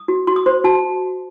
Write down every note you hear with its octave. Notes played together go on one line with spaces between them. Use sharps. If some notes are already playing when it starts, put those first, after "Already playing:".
Already playing: D#6
F#4
F#4 C6
D#6
C5 C6
F#4 A5